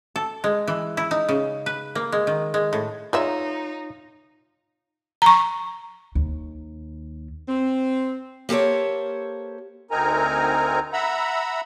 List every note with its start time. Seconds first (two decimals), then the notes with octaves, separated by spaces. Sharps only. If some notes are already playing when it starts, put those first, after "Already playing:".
0.16 A4
0.44 G#3
0.67 E3
0.97 E4
1.11 D#4
1.29 C#3
1.66 B4
1.95 A#3
2.12 G#3
2.27 D#3
2.54 G#3
2.73 A2
3.13 G#3 D#4 F4 C#5 D5 E5 A#5
5.22 A#5 C#6
6.15 D#2
7.48 C4
8.49 A#3 G4 A4 C5 C#5
9.91 D2 C4 D#4 A#4 G#5 A#5
10.93 E5 F#5 A#5 B5 E6